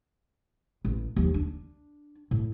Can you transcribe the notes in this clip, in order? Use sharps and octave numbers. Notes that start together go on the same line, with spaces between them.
A1
D#2 F3
D4
A2